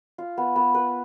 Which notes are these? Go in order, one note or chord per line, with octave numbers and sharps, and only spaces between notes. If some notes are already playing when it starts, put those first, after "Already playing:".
F4
B3
B3
B4